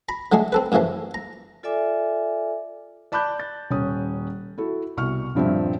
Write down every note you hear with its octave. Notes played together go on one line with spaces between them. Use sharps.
A#5 B5
D3 F#3 G#3 A3 G#4
C4 A4 B4
F#2 A2 C#3 E3 F3
A#5
F4 A4 D5 E5 G#5 D6
D5 A5 B5 D6 F#6 G6
A6
D#1 C#4 D#6
E4 F#4 A4
C2 B2 C#6 F6
D#1 G2 F3 C4 D4 E5